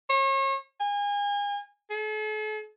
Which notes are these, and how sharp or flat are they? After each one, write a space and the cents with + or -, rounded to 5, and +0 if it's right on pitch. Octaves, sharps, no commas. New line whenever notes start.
C#5 -40
G#5 -35
A4 -45